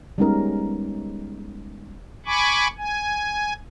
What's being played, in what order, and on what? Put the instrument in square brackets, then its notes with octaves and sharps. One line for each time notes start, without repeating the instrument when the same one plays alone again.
[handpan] G3 G#3 B3 C#4 D#4 A#4
[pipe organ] G#5 B5 C#6 D6
G#5